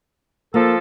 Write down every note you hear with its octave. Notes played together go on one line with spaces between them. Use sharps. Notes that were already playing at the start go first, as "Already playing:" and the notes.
F3 A#3 A4